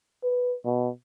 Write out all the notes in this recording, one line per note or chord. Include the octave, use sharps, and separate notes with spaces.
B4
B2